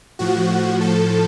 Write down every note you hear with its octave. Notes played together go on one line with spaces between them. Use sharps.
A2 F3 F#4
A4